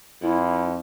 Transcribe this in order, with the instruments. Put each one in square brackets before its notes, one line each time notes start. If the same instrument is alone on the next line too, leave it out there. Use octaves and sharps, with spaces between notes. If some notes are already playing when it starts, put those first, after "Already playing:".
[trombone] F2 [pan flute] E4